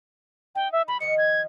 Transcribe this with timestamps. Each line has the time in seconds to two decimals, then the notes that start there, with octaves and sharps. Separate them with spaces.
0.55 D#4 G5
0.72 E5
0.88 G3 B5
1.00 D#3 F3 D#5 C#7
1.18 G#6